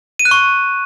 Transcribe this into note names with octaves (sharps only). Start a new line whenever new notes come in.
D#7
F#6
C#6